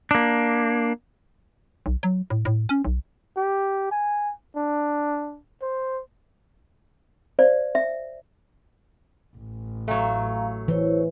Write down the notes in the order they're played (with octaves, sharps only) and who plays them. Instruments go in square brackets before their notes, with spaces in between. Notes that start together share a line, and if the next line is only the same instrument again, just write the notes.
[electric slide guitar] A#3 D4
[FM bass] B1
F#3
A2
A2
C#4
B1
[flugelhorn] G4
G#5
D4
C5
[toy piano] C5 D5 F5
E5
[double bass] A1
[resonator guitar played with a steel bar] F#3 A3 [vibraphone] F5 G#5 A#5
[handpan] E3 [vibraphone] E4 C5 C#5